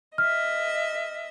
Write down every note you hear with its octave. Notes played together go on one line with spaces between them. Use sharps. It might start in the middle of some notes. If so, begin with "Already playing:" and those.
D#5 E5 F6